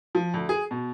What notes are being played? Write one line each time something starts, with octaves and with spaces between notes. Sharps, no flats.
F3
D2
G#4
B2